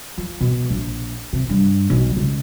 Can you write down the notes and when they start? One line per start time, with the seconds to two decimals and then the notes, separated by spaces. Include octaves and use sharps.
0.18 F3
0.41 B2
0.70 A#1
1.33 C3
1.49 G2
1.90 B1
2.17 C#2